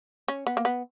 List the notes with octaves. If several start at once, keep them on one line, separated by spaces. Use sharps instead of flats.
C#4
B3
A#3
B3